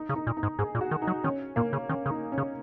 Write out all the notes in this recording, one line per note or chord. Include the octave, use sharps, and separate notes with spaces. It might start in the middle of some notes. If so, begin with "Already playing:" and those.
Already playing: D#4
C#3
D#4
A#2
D#4
G#2
G#2 G#4
A#2
F#4
D#3
D#4
F#3
D#3 C#4
A#2 A#3
C#3
D#3 C#4
C#3
D#4
C#4
C#3